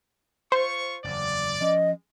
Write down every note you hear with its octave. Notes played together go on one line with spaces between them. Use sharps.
F4 C5 C#6
F#1 E2 D5
F3 C#4 D#5